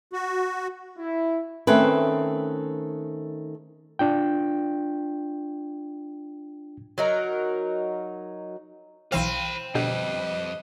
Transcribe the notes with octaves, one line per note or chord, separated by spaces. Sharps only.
F#4
E4
D#3 A3 C4 C#4 B4
D4 F4 G5
F#3 D#4 A#4
B1 E3 C4 C5 F5 B5
F2 B2 D3 G3 G4 B4 D#5